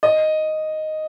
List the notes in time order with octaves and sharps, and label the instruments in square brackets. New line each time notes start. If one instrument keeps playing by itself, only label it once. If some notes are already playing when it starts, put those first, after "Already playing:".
[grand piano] D#5